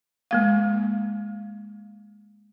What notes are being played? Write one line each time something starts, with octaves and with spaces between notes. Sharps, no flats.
G#3 A#3 F5